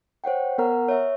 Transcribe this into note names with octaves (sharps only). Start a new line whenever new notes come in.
C5 C#5 F#5 G5
B3 A#4 F#5 A#5 F6
C#5 E5